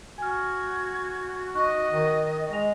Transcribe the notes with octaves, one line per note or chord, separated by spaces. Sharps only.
F#4 G#5 F6 G#6
D#4 D#5 C#6 F#6
D#3
G#3 A#6 F7